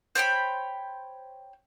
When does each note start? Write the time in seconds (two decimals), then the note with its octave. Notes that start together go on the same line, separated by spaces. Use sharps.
0.15 C5 C#5 G5 B5